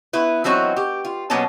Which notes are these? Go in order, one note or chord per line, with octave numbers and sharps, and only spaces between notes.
B3 E4 B4
E3 F#3 C4 D#4 F#4
G4
F4
B2 F#3 A#3 B3 C#4 A5